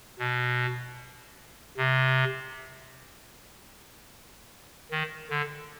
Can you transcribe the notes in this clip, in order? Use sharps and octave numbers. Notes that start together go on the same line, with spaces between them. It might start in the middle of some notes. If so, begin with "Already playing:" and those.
B2
C3
D#3
D3